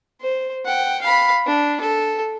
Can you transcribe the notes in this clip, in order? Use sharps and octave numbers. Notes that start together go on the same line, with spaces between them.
C5
F#5 G5
F5 B5
D4
A4